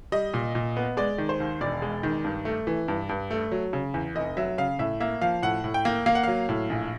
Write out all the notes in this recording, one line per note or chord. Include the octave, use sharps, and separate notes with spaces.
G3 D#5
A#2
A#2
B3
G#3 D5
D#3
C5
D#2
E1 D5
G#3
D#3
G2
A3
E3
G2
G2
A3
F#3
C#3
E2
F1 D#5
F#3 E5
C#3 F5
A2 E5
A#3 E5
F3 F5
A2 F#5
A2
G5
A#3
A#3 F5
F#5
F#3 F5
A2
A#1